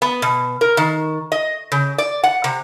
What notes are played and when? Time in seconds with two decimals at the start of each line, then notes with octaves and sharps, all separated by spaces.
0.02 B3
0.22 B2
0.61 A#4
0.77 D#3
1.32 D#5
1.72 C#3
1.98 D5
2.23 F#5
2.44 C3